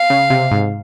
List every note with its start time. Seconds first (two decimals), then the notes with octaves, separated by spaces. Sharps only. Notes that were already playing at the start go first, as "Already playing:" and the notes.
Already playing: F5
0.10 C#3
0.30 C3
0.51 G#2